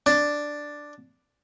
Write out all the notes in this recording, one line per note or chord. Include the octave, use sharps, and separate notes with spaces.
D4